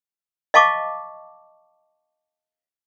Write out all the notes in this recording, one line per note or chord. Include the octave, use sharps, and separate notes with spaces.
D#5 F5 A5 C#6 D6